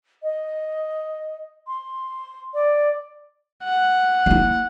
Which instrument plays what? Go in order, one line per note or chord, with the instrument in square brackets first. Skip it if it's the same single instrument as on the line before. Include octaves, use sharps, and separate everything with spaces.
[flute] D#5
C6
D5
[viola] F#5
[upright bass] A#3 E4